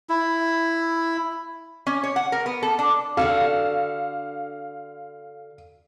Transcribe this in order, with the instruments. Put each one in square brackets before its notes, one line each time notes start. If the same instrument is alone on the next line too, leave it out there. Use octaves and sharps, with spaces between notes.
[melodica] E4
[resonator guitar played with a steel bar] C#4
C#5
F#5
A#4
B3
A4
D4
[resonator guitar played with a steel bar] D3 F#4 A4 [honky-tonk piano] F5